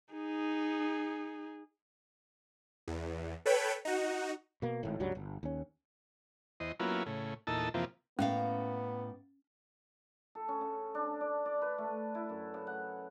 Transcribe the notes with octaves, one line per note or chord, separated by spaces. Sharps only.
D#4 G#4
E2
A4 B4 C#5 G5 B5
D#4 F#4
B2 A#3
G#1 A2
C#2 G2 F#3 G3
G1
D#2 C#4
E2 C5 D#5
F#3 A#3 B3 C#4 E4 F4
A2 C#3
E2 A#2 D#4 A4 A5 E6
F2 C3 E3 F3 A#3 C4
A2 A#3 B3 C#4 F5
A4
C#4
C#3
D4
D5
D5
B4
A3
E4
F#2
C#3
F#5